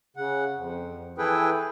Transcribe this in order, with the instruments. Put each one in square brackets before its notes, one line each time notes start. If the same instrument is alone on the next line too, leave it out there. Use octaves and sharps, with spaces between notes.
[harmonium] C#3 F#5
F2
E3 E4 G#4 A4 B4 G5